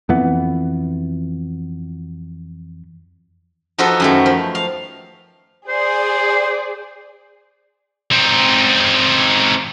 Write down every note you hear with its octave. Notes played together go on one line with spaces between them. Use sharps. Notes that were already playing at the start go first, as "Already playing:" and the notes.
F2 E3 B3
F3 D#4 F4 F#4 A4 B4
F#2 D#3 A3
F3
F5
G#4 C5 D5
C4 D#4